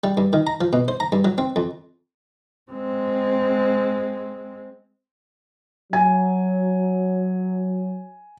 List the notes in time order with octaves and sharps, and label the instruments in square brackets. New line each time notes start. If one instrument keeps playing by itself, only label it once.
[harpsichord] G3
G2
D#3
A#5
F3
B2
C5
A#5
G2
F#3
C4
F2
[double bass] G#3 C4
[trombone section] F#3 [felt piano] G#5